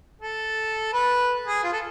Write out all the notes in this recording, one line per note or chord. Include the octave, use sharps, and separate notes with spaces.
A4
B4
G#4
F4
A4